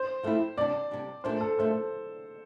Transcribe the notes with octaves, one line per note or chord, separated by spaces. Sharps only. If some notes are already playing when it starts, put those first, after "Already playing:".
Already playing: C5
F3 A3 C4 E4
C3 G3 D4 D5
C3 G3 D4
A#2 A3 D4 C5
A4
A#2 A3 D4 C5